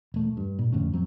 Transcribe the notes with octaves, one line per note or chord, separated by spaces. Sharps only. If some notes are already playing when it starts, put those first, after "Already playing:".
E1 A3
G2
A#2
F2 A2 D3 C#4
F2 F#3 C4